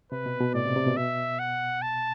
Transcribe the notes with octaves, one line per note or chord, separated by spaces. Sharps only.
C3 B4
B2
B2
A2 D5
C3
C3
B2
B2 E5
F#5
A5